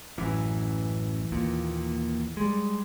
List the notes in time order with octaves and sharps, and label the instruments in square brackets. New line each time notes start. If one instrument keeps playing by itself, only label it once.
[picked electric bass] A1 F#2 [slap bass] E3
[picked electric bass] D#2 A#2
G3 G#3